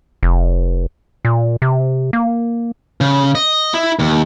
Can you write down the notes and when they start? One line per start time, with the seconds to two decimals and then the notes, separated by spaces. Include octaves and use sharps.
0.23 F1
1.25 A#2
1.62 C3
2.13 A#3
3.01 C#3
3.35 D#5
3.74 E4
3.99 D#2